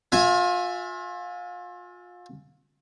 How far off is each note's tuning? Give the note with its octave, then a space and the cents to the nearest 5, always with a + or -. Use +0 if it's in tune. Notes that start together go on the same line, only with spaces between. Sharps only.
F4 +35 E5 +0 G#5 +0